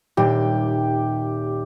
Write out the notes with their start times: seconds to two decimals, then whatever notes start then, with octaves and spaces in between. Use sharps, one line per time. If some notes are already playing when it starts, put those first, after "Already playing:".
0.17 D#1 G4